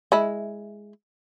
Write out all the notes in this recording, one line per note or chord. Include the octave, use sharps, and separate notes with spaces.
G#3 E4